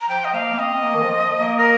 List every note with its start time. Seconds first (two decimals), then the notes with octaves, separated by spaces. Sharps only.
0.01 A#5
0.09 F3 G5
0.25 D#5
0.34 A#3 F5
0.53 A#3
0.58 C4 D#5
0.74 C4
0.83 A#3
0.95 D#3
1.03 F3
1.39 A#3
1.58 A#4